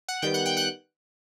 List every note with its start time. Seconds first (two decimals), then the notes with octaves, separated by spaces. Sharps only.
0.08 F#5 F#6
0.22 D#3 G3 B3 G5 G6
0.34 F#5 F#6
0.46 G5 G6
0.57 F#5 F#6